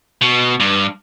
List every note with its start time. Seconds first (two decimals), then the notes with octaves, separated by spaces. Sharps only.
0.21 B2
0.60 G2